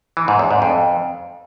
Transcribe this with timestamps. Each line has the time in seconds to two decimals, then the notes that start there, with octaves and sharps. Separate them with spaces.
0.17 E3
0.28 G#2
0.39 E2
0.51 G#2
0.62 F2